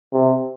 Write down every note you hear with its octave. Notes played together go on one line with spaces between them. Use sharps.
C3